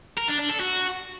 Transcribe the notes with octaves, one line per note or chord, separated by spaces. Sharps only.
A#4
D4
D4
A4
F#4